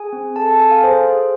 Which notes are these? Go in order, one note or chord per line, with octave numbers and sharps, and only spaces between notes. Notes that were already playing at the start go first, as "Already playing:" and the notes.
Already playing: G#4 G#5
C4
A4 A5
A5
A4 G#5
F5
G#4 C5
G#4